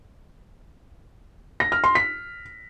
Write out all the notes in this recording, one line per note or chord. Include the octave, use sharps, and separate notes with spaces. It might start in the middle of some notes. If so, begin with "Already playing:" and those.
A#6
F6
C6
B6